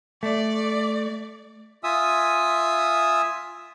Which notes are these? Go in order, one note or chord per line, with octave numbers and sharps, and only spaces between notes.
A3 D5
F4 E5 G#5 D#6 E6